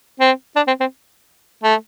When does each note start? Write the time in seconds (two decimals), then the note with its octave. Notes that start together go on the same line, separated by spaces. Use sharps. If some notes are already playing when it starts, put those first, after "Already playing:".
0.20 C4
0.56 D4
0.67 C4
0.80 C4
1.64 A3